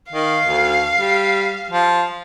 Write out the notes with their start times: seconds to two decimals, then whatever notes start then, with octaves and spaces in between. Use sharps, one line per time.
0.12 D#3 F5
0.45 D2
0.98 G3
1.70 F3